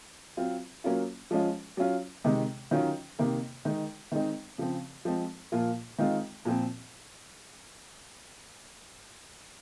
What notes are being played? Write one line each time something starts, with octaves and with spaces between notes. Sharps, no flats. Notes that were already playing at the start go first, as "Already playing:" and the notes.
F#3 C4 F4
F#3 A#3 C#4 F4
F3 G#3 C#4 F4
F#3 C#4 F4
C3 D#3 G#3
D#3 F#3 C#4 F4
C3 D#3 A#3
D#3 G#3 D#4
D#3 G#3 C4 D#4
C#3 F3 C4
F3 G#3 C4
A#2 F3 A#3 F4
D#3 G#3 C4 F4
A#2 F3 C4